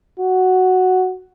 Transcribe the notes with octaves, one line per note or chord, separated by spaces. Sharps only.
F#4